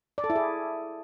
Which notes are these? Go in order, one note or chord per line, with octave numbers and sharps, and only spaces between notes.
D5
A4
E4
G#4